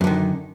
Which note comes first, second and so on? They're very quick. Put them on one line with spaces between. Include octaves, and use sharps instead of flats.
F#2 D3 D#3